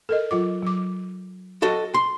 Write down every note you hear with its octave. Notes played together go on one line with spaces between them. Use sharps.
A4 A#4 D#5
F#3 F4 D6
F#3 D6
F#4 A4 D#5
C6